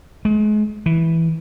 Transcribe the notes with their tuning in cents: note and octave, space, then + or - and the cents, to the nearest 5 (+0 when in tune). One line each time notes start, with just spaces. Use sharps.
G#3 +35
E3 -5